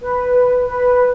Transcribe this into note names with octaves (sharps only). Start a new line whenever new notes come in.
B4
B4